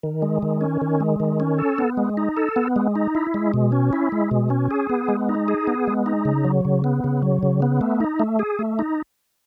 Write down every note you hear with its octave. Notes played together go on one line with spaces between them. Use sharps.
D#3
G#3
D#3
C#4
D#3
G#3
D#3
C#4
A4
B3
G#3
D#4
A4
B3
G#3
D#4
E4
G#3
B2
C#4
E4
G#3
B2
C#4
G#4
B3
G#3
D#4
G#4
B3
G#3
D#4
C#3
F#3
C#3
B3
C#3
F#3
C#3
B3
A3
D#4
A3
G#4
A3
D#4